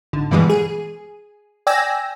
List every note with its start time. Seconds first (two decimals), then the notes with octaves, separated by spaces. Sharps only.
0.13 G#1 D3
0.31 G2 B2 E3 G3 G#3
0.50 G#4
1.67 D5 G5 G#5 E6 A#6